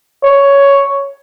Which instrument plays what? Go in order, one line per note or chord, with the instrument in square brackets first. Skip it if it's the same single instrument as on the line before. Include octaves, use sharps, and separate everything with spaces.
[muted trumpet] C#5